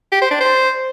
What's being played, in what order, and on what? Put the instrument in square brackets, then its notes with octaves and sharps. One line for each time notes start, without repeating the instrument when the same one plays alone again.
[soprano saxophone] G4
C5
D4
C5